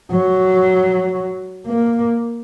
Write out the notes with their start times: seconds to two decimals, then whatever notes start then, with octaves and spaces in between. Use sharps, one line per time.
0.12 F#3
1.67 A#3